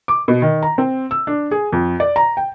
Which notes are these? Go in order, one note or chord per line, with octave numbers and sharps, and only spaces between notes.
D6
B2
D#3
A#5
C4
E6
D4
G#4
F2
D5
A#5
G5